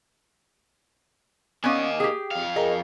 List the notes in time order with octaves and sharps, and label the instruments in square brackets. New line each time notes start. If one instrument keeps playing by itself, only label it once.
[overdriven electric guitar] A#3 D#5 [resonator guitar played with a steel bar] B3 C#4 F5 [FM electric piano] G#5 D6
[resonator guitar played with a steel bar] G4 G#4 [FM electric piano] G5
[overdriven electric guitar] F2 F5
[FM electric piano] G#4 A#4 [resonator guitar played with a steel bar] D#5